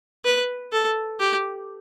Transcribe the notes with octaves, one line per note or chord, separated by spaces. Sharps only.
B4
A4
G4